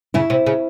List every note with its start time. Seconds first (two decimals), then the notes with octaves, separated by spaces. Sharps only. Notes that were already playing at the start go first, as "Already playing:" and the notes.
0.14 C#3 E4
0.30 C3
0.46 C#3